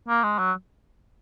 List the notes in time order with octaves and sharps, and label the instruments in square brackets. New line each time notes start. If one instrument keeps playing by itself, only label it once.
[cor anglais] A#3
G#3
F#3